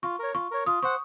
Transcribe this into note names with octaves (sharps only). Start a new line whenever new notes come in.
F4 C#6
A#4 C#5
F4 C#6
A#4 C#5
F4 D#6
C5 F#5 C#6